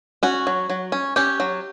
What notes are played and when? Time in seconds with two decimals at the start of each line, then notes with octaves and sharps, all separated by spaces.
0.23 C#4 F#4
0.47 F#3
0.70 F#3
0.92 C#4
1.16 C#4 G4
1.40 F#3